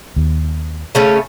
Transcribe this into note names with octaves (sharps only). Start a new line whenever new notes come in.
D#2
C#3 A3 C#4